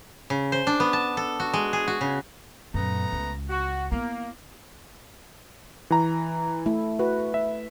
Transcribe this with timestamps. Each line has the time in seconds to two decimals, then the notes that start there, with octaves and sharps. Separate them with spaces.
0.30 C#3
0.52 C5
0.67 D4
0.80 B3
0.93 A5
1.17 A4
1.40 F#4
1.53 G#3
1.73 G#4
1.88 F#4
2.01 C#3
2.74 F#2 A#2 A3 B3 A#5
3.12 C#2
3.49 F#4
3.92 A#3 B3 E4
5.90 E3 A#5
6.66 A3 E4
6.99 F#4 B4
7.34 E5